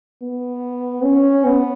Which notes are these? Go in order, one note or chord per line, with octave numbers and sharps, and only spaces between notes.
B3
C#4
B3